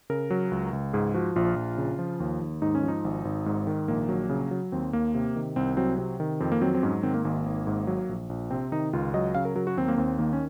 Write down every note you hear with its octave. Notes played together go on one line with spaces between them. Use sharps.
C#3 A#4
F#3
C#2
C#2
G#2 G#4
F3 F#4
A#1 F4
A#1
C#3
F3
D#2
D#2
G#2 D#4
C#4
F3
D#4
G#1
G#1
G#2
D#3
A#1 A#3
F#3
C#3
F#3
D#2 C4
D#2 A#3
C3
D#3
C2 C4
F#3 C4
C3 C4
D#3
F2 C4
A#3
F#3 C4
C4
G#2 C#4
D#3 C4
A#3
G#1 A#3
G#1
G#2
F#3
A#1
A#1
C3 C4
D#3 D#4
C#2 F4
F#3 D#5
C#3 F5
A#4
F#3 A#4
F#4
D#2 C4
A#3
D#2 C4
D#3 A#3
C#4